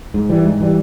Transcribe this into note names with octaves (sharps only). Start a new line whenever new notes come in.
G#2
E3 G3
G#2
E3 G3